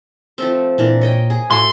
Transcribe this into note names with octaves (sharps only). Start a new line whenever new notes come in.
F3 A3 C4
A#2 E3 D4 A#4
C#5 D#5 G5
G#4
A2 A3 F#4 C6